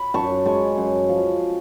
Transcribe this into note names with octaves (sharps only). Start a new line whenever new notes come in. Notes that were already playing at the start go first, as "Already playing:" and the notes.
Already playing: B5
F#2 A5 C#6
G#3 A5 C#6
F#2
F3